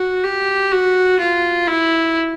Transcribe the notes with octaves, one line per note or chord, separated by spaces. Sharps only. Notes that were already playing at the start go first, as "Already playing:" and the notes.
Already playing: F#4
G4
F#4
F4
E4